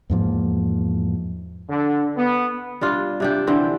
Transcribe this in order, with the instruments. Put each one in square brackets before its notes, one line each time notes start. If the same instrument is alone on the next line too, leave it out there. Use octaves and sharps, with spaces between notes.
[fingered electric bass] E2 G#2 F3 A#3
[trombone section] D3
B3
[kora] G3 D4 F4
C3 D4 G4
D3 E3 C4